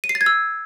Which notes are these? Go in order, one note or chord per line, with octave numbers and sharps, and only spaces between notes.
D#7
C7
A6
G#6
E6